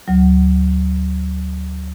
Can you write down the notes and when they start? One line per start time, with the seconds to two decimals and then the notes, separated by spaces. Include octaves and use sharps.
0.08 D2 F#3